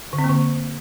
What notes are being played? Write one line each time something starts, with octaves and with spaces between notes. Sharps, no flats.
D3
C4
A#3
D3